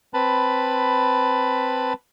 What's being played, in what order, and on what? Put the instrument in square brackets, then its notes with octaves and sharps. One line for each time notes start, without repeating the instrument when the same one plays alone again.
[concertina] C4 B4 A5 B5